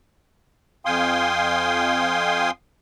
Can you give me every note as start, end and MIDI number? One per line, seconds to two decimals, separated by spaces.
0.85 2.51 41
0.85 2.51 77
0.85 2.51 79
0.85 2.51 80
0.85 2.51 84
0.85 2.51 87